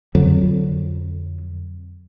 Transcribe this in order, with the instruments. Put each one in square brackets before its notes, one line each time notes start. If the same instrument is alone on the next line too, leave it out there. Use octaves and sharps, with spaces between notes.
[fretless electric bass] F2 D3 F#3